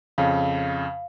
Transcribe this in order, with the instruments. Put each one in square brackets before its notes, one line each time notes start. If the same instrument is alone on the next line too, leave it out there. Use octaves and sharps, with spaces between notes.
[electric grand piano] F2 C#3 [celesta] F5